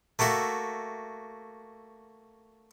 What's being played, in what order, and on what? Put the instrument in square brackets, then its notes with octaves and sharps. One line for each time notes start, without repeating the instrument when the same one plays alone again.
[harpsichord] A3 A#3 F#4 E5